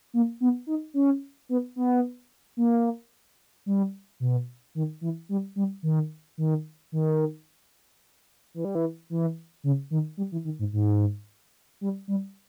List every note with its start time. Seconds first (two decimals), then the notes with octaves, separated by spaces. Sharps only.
0.14 A#3
0.40 B3
0.67 D#4
0.94 C#4
1.49 B3
1.76 B3
2.57 A#3
3.66 G3
4.20 B2
4.75 D#3
5.01 E3
5.29 G3
5.56 G3
5.83 D#3
6.38 D#3
6.92 D#3
8.54 E3
8.65 G3
8.75 E3
9.10 E3
9.64 C#3
9.91 D#3
10.17 G3
10.32 E3
10.45 D#3
10.59 G#2
10.73 G#2
11.81 G3
12.08 G3